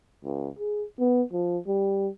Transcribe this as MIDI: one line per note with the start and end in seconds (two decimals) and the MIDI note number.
0.24 0.48 37
0.59 0.84 68
0.99 1.22 59
1.32 1.58 53
1.67 2.07 55